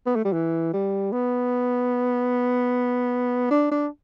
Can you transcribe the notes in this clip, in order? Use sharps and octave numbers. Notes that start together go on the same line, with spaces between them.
B3
A3
G3
E3
G3
B3
D4
D4